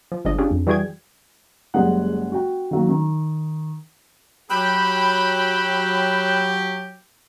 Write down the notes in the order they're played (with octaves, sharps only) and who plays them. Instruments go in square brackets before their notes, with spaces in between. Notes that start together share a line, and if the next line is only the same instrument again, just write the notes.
[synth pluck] F3
G1 F3 G#3 D4 D#5
C#4 D4 F4 G4 G#4
F2
E3 G3 F#4 G#4 G5 G#6
[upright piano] F#1 G3 G#3 F#5
F#4 G5
D#3 F#3 A#3
D#3
[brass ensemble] F#3 G4 [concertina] G5 E6 F#6 [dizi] B5